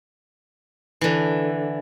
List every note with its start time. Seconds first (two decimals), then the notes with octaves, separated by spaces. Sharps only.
1.01 D3 E3